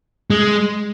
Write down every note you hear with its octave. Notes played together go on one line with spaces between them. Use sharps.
G#3